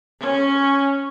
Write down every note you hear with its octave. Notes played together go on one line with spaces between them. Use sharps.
C#4